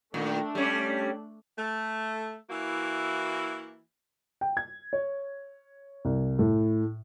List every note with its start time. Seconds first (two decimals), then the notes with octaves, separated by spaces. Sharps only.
0.14 A#2 D#3 A3 D4
0.55 G3 C#4
1.58 A3
2.50 E3 A#3 E4 F#4
4.41 G5
4.57 G#6
4.93 C#5
6.05 C2
6.39 A2